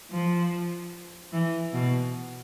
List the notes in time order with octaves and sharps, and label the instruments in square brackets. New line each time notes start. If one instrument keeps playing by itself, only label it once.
[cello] F3
E3
B2